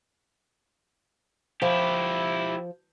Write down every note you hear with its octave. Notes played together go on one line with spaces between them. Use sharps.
F3 E4 G4